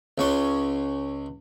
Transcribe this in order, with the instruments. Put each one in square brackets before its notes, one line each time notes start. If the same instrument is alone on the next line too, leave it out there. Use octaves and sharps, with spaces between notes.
[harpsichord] C#2 C#4 C6